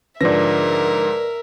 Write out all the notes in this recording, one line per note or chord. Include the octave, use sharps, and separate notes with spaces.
G#2 D3 F3 A#4 B4 D5 E5 A#6